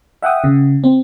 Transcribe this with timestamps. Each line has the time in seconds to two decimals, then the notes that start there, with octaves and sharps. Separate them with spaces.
0.22 E5 F#5 G5 D#6
0.44 C#3
0.84 C4